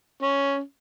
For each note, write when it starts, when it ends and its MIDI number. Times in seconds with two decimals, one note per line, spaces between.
0.22 0.59 61